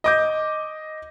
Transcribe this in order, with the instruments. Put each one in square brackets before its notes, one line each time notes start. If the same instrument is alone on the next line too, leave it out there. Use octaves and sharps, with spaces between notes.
[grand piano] D#5 D6 G6